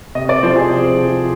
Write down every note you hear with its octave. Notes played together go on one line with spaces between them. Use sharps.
C3 D#5
D5
F3 C5
G#4
C3
F3